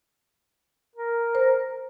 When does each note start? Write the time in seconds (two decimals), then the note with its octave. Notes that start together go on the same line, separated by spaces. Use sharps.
0.96 A#4
1.35 C5